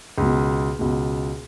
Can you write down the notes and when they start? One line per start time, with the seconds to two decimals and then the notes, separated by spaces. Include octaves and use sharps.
0.18 C#2 B2
0.79 C#2 B2